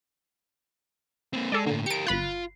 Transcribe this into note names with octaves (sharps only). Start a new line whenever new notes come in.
A#3 C4
G#3 A4 D5
A2 D3 A#3
G4 A#4 C#7 D7
G1 F4 B5 F#6